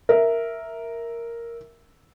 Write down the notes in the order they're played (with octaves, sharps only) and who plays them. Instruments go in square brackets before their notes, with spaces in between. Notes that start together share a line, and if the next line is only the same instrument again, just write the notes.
[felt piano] A#4 E5